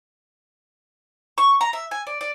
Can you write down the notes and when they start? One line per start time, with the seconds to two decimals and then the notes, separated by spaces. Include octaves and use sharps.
1.38 C#6
1.61 A#5
1.73 E5
1.91 G#5
2.07 D5
2.21 D5